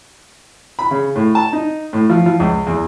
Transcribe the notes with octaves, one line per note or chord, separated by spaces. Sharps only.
B5
C#3
A2
A5
D#4
A2
F3
F3
C#2
E2